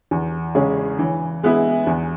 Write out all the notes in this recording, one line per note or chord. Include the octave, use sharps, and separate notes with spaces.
E2
C#3 G#3 C#4 G#4
E3
G#3 B3 E4
E2